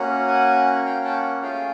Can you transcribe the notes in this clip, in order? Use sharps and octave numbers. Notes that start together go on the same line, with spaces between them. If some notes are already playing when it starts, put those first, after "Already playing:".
Already playing: A#3 C#4 F#4
F#5 G#5
F5 G5
G5 A5
A3 C#4 F4 G#4 F5 G5